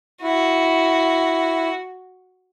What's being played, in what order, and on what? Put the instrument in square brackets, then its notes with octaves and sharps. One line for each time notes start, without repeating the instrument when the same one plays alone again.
[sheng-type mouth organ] E4 [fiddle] F#4